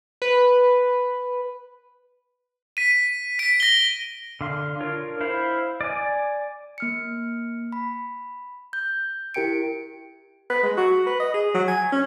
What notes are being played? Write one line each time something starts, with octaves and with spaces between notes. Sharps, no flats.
B4
B6 D#7
B6 D7
A#6 G7
D3 F5 C6
D4 F4 A#4 C#5
E4 C5 E5 F5
D5 G#5
A#3 F6 C#7
B5
G6
E4 G4 A#4 G5 C#7 D7
B4
G#3
F#4
B4
D#5
G#4
F#3
G#5
C#4